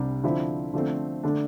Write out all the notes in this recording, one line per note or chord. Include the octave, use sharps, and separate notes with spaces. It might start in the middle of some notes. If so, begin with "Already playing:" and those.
Already playing: C2 C3 G3 D4
D3 F3 C4 E4
D3 F3 A3 C4
D3 A3 D4